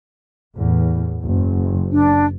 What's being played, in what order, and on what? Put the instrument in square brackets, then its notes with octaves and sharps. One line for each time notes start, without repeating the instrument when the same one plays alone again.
[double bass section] E2 A2
F#1
[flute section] D4